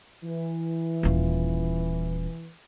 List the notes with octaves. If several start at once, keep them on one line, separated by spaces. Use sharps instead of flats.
E3
D#1 F4